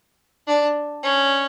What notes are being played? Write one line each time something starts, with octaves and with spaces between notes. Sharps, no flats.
D4
C#4